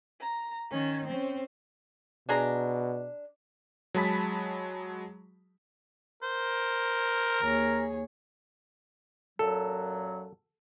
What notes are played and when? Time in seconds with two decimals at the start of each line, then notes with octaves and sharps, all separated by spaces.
0.21 A#5
0.71 D#3 C#4
1.08 C4 C#4
2.29 B2 D4 G#4 A#5
3.94 F#3 G#3 G#4 A5 B5 B6
6.23 A#4 C5
7.42 D#2 G#4 C#5 A#5
9.39 F#2 A#2 F#3 A4